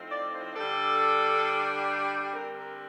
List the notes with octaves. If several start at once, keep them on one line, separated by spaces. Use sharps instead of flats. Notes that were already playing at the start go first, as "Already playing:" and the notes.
Already playing: A2 F3 C4 D#4
D5
C5
D3 G3 D4 A4
D3 G3 C4 A#4
A#4